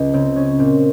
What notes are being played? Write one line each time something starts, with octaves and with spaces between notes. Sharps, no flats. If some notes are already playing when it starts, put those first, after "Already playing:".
Already playing: C#2
C#3 C4
C#4
A#2 C4